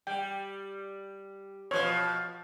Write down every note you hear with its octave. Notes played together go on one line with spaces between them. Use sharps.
G3 G5
B2 F3 C#5